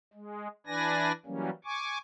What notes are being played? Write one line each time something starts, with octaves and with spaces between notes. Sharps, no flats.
G#3
E3 D4 B4 D5 G#5 A#6
E3 F#3 G3 A#3 C#4
G#5 C#6 D6